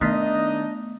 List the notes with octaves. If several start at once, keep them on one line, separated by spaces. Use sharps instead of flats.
D#3 A3 B3 D4 D#4 D#5 B6